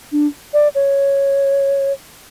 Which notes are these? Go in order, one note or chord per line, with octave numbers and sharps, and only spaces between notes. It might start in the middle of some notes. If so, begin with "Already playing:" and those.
D4
D5
C#5